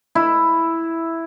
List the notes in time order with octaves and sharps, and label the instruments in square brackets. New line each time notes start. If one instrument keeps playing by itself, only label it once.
[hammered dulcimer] E4